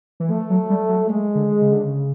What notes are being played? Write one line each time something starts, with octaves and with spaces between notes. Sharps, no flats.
E3
F3 A3
F#3
G3
F#3
G#3
D3
C#3
D3
C#3